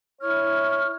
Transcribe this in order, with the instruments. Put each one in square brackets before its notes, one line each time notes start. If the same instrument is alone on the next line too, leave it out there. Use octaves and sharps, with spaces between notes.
[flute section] E4 F6 [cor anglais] C#5